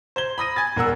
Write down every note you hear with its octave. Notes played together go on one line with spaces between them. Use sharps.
C5 G#6 G7
B5 D#6 A#6 D#7
G#5 G#6 A6
E1 A#4 F#5 E6